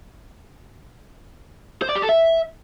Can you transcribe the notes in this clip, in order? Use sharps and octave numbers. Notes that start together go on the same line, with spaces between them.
C5
D5
G4
A4
E5